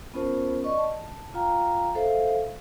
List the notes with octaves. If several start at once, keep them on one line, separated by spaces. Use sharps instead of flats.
B3 C#4 F4 A#4 C5 A5
D5 D#5 C#6
A5
F4 F5 G5 A#5
A4 C5 E5 F5